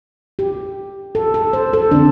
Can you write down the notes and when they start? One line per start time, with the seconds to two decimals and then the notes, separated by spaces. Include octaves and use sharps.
0.39 G4
1.15 A4
1.34 A4
1.53 C5
1.73 A4
1.91 D3 C4 D4